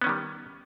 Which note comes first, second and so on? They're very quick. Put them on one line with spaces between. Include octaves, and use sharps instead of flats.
B3 C#4 D#3 G3